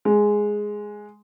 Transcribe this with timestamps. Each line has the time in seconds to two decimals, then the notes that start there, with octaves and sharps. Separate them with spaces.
0.05 G#3